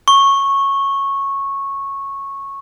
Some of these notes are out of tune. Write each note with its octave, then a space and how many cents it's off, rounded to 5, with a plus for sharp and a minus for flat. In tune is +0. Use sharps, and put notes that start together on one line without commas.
C#6 -10